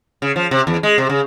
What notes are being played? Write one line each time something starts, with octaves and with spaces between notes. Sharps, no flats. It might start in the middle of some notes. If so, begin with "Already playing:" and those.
C#3
F3
C3
E2
G#3
C3
C#3